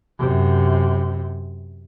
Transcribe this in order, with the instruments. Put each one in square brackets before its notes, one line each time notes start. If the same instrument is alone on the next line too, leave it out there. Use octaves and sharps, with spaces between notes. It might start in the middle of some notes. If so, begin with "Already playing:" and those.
[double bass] F#2 C3